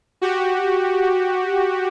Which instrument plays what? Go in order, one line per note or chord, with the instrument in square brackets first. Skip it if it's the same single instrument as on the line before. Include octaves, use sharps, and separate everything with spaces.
[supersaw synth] F#4 G4